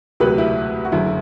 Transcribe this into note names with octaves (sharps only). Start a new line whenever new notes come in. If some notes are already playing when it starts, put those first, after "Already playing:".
E1 D2 C3 F#3 G4 B4
E4 G4
F#4
F#1 F#2 D3 E4